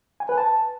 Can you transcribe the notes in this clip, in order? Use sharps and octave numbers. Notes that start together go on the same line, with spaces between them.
G#5
B4
A5